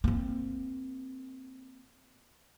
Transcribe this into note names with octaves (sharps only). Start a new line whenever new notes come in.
A#3 C4